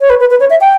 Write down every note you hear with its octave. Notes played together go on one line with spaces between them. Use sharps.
C#5
B4
B4
B4
C#5
E5
G5